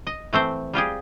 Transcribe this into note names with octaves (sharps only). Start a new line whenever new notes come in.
D#5
E3 A3 C4 C5
G3 F4 G4 G#4